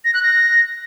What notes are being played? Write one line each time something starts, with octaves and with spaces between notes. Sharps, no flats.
A#6
F#6
A#6